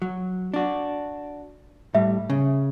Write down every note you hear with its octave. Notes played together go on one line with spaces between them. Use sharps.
F#3
D4 F#4
A2 G3 E5
C#3